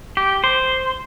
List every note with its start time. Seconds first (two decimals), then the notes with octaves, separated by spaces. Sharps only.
0.17 G4
0.44 C5